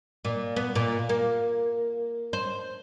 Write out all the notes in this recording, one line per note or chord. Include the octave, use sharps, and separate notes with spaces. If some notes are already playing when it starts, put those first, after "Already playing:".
A#2
B3
A#2
A#3
C5